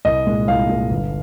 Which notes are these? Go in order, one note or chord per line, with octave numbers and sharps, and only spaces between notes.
C2 D#5
A#2 G#3
C2 F5
A#2 G#3
G1